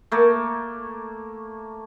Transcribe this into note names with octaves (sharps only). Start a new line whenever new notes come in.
A3 A#3